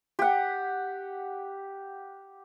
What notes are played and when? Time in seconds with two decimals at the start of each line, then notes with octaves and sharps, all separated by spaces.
0.19 G4 F#5